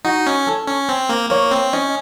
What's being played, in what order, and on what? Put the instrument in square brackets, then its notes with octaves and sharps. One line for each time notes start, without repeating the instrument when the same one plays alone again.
[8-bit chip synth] D#4 [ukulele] F#4
[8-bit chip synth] C#4
[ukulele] A4
[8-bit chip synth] C#4
C4
A#3
[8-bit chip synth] A#3 [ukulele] C#5
[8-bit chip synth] C4
[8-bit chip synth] C#4 [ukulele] D#5